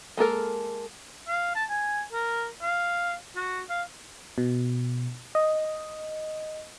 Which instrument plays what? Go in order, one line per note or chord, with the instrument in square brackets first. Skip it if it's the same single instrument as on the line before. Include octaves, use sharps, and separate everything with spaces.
[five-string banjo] G#3 A#3 A4 A#4
[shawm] F5
A5
G#5
A#4
F5
F#4
F5
[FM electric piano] B2
D#5